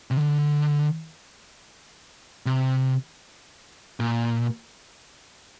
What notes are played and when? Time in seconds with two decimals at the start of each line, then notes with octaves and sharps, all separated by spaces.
0.11 C3
0.17 D3
2.46 C3
4.00 A#2